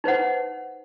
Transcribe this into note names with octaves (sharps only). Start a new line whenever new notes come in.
D#4 B4 C5 F#5